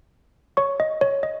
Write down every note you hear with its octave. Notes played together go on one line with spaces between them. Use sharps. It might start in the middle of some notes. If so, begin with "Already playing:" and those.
C#5 C#6
D#5
C#5
D#5